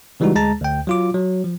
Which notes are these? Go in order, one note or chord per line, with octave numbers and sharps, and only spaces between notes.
C#3 E3 G3 G#3 D#4 F#4
D2 G#3 A5 A#5 A6
D2 G5
F#3 F4 D6
F#3
F3